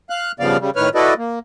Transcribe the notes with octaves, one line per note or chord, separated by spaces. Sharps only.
F5 F#6
G2 C#3 F3 B3 D5 F5
C#3 G3
A2 D#3 B4 C#5 F6
E4 F#4 A4 B4 D5 D#5
A#3